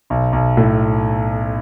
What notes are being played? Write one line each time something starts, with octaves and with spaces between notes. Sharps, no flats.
B1
B1
A2